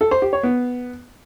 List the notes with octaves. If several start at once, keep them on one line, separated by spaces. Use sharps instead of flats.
A4
C5
G4
C#5
B3